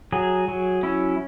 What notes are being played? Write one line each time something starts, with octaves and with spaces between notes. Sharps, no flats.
F#3 G#4
F#3
C#4 E4